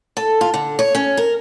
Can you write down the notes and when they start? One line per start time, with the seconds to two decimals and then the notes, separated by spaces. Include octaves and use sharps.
0.17 A4
0.41 F4
0.54 D3
0.79 C#5
0.95 C#4
1.17 A#4